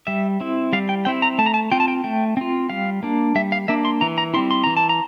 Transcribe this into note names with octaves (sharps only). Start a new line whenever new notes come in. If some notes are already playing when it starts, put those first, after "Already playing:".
G3 E5
C4 E4
G3 F5
G5
C4 E4 G5
A#5
A3 A5
A#5
A5
C4 F4 G5
A5
G5
A3 G5
C4 F4
G3 F5
A#3 D4
G3 E5
F5
A#3 D4 E5
C6
E3 A#5
A#5
G3 C4 E4 C6
C6
E3 A#5
A5
A#5